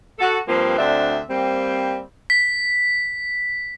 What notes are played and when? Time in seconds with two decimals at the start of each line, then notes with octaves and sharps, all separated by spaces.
0.19 F#4 A4
0.47 G2 F3 A#3 C4
0.78 D2 C4 D4 E5
1.29 G3 A#3 C4
2.30 B6